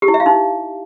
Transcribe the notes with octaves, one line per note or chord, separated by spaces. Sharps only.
G4
E4
E5
F5
D#4